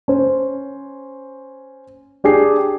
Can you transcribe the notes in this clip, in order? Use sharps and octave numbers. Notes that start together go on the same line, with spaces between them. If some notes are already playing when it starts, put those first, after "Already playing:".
C#4 C5
D4 G4 G#4 C7